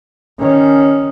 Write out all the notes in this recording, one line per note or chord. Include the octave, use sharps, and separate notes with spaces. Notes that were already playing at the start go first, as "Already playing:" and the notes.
D#3 C#4